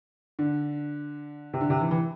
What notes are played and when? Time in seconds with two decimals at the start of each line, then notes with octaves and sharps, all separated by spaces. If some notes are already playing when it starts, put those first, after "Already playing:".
0.39 D3
1.54 C3
1.61 D3
1.70 C3
1.81 E3
1.91 E3